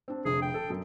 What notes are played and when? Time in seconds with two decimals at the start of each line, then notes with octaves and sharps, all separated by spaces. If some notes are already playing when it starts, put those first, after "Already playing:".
0.08 C4 D4
0.25 F1 D3 G#4
0.42 G5
0.54 A4
0.70 F#2